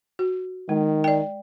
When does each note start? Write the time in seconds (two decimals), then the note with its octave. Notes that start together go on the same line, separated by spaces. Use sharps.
0.19 F#4
0.69 D#3 G#3
1.04 D5 G5